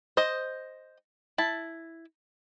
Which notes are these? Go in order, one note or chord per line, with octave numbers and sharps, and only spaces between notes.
C5 D#5
E4 A5